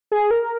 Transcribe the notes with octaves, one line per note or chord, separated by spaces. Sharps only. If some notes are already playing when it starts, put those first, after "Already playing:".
G#4
A#4